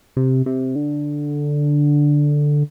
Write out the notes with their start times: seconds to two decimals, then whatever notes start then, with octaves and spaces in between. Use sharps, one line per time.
0.16 C3
0.46 C3
0.76 D3